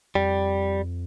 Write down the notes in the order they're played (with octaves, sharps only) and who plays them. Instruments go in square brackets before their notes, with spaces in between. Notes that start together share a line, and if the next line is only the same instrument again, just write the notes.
[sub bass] F2 [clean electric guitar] G3